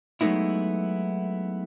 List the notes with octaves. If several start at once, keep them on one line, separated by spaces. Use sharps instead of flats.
F#3 G#3 A3 B3 D#4 E4